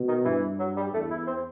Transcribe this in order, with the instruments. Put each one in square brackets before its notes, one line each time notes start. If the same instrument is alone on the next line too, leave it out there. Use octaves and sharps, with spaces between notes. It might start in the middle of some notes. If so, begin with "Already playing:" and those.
Already playing: [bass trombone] B2
[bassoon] D#3
[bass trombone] G2 [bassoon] E3
[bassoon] F#3
G3
[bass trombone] E2 [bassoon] A3
[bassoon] E4
C4